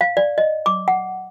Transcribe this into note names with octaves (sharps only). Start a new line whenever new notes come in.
F5
D5
D#5
D6
F#5